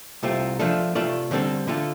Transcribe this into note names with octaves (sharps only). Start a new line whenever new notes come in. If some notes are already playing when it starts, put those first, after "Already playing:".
C2 C3 A3 C4 F4
F3 A3 D4 F4 A4
C3 A3 F4 A4 D5
D3 G3 C4 A4
D3 A3 F4 A4